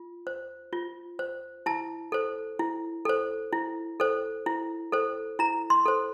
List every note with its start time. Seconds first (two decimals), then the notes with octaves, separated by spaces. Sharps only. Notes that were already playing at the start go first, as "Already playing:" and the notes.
Already playing: F4
0.27 C5
0.73 F4
1.19 C5
1.66 E4 A5
2.12 A4 C5
2.59 E4
3.05 A4 C5
3.53 E4
4.00 A4 C5
4.46 E4
4.92 A4 C5
5.39 E4 A#5
5.70 C6
5.86 A4 C5